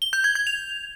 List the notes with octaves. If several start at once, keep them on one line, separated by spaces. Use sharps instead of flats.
G7
G6
G#6
G#6
F7